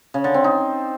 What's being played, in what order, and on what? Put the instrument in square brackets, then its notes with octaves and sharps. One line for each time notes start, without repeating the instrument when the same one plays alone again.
[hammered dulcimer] C#3
D3
C4
D#4